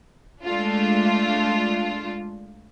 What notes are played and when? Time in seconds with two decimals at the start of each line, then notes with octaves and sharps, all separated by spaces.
0.44 G#3 A3 D4 F4